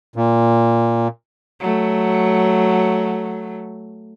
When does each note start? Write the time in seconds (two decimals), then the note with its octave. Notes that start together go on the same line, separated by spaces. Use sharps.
0.16 A#2
1.60 F#3 A3